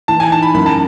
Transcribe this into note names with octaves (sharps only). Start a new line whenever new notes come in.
E3 A5
G#5
D#4 A5
B5
F#2 B5
A5